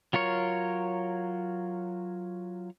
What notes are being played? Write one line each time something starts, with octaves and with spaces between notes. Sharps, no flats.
F#3 F4 A#4 C#5